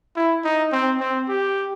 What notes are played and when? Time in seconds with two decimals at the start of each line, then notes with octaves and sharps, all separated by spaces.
0.16 E4
0.44 D#4
0.72 C4
1.00 C4
1.28 G4